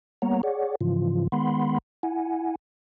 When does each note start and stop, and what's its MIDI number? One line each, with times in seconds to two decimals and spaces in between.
0.22 0.41 55
0.22 0.41 58
0.22 0.41 59
0.22 0.41 73
0.22 0.41 78
0.22 0.41 82
0.43 0.75 68
0.43 0.75 73
0.43 0.75 74
0.43 0.75 78
0.81 1.27 44
0.81 1.27 49
0.81 1.27 52
0.81 1.27 53
0.81 1.27 65
1.32 1.78 51
1.32 1.78 56
1.32 1.78 59
1.32 1.78 78
1.32 1.78 83
1.32 1.78 84
2.03 2.55 64
2.03 2.55 78
2.03 2.55 80